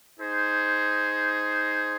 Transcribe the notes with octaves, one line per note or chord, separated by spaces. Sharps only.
D#4 G#4 C5